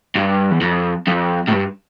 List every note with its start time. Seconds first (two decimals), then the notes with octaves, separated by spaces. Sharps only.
0.15 G2
0.51 E2
0.61 F2
1.07 F2
1.48 A2
1.52 G2